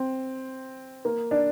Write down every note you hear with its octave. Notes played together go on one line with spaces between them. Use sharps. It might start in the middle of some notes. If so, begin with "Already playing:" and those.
Already playing: C4
A#3
D4